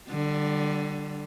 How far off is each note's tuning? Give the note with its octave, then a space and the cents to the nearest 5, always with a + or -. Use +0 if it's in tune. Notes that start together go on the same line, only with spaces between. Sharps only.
D3 +15 G3 -20